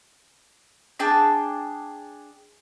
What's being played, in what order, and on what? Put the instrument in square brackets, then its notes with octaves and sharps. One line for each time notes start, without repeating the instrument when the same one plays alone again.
[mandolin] D4 G#4 G5 A5